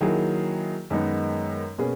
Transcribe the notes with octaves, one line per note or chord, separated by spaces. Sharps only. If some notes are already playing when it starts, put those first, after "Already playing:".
D#3 F#3 A#3 E4 G#4
F#2 D#3 G#3 B3 D#4
B2 A#3 C#4 G#4 B4